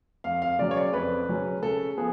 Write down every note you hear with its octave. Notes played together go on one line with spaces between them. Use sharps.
F2 F5
F5
C#3 F#3 C#4 D5
C#5
D5
F2 B4
C#3 F#3 C#4
C#3 A4
F3 B3 G#4